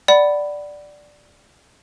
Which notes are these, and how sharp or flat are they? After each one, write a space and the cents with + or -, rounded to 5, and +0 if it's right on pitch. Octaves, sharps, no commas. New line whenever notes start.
D5 +0 F#5 +25 B5 +0